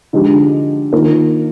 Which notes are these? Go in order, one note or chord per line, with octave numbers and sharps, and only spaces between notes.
D3 F3 G#3 D#4 G4
D#3 A#3 F4 A#4